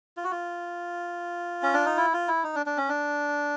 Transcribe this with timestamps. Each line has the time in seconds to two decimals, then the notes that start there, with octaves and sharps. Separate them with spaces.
0.17 F4
0.24 F#4
0.31 F4
1.63 C#4
1.74 D4
1.85 D#4
1.97 E4
2.14 F4
2.28 E4
2.44 D#4
2.55 D4
2.66 D4
2.77 C#4
2.89 D4